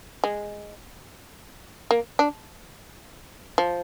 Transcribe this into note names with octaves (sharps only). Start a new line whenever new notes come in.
G#3
A#3
D4
F3